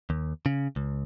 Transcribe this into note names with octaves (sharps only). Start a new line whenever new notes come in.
D#2
C#3
C#2